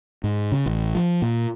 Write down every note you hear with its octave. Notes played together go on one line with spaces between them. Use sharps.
G#2
C#3
A1
F3
A#2